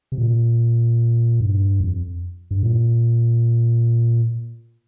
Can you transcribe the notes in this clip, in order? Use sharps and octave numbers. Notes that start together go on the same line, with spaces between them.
C3
A#2
G2
F2
G2
A#2